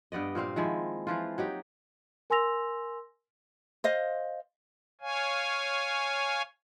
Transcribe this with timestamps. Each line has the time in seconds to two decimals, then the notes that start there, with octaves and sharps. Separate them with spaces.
0.12 G2 B3 D5 D#5
0.35 A#2 A#3 C4 F5
0.56 D#3 F3 G#3 E4
1.07 E3 F3 F4
1.38 F#3 D#4 G4
2.30 A#4 G#5 C6 E6 A#6 F7
3.84 C5 D#5 F5
5.01 C#5 F5 G#5